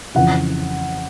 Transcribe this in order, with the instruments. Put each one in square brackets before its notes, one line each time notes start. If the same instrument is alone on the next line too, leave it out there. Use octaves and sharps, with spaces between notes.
[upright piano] F2 C#3 E3 F#5